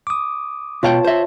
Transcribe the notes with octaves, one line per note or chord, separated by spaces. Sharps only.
D6 D#6
B2 F4 C#5 F5 G5 A5
C5 E5